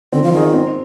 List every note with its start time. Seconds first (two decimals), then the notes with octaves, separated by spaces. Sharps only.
0.12 D3 C4
0.23 F3
0.33 D#3 F4 G#4 D#5
0.54 C4